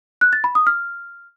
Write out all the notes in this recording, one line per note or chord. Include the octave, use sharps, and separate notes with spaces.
F#6
A6
B5
D#6
F6